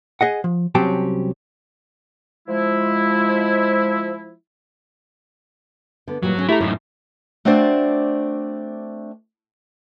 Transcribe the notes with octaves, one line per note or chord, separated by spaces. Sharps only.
G#4 D#5 F#5
F3
C2 F#3 C4 C#4 G4 A5
F3 G#3 E4
D3 B3
A#2 E3 F#3 G3
G#2 D3 C#4
A3 E4 G4 A4 E5 A#5
F#2 A2 D#4 C#5
A3 C4 D4 F#4 C5 D5